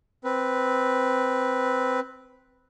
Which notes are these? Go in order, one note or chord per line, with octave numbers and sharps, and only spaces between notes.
C4 B4